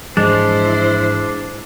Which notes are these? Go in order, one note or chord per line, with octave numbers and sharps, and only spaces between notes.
G#2 E3 F3 G#3 D4 E4 C5